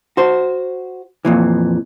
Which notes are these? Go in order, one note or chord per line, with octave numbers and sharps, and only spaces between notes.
F#4 C5
F2 A#2 E3